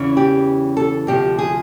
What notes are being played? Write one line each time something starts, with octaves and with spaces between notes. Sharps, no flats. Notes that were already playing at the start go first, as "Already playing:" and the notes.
Already playing: E2 C#3 E3
G4
A4
D2 C3 F3 G4
G#4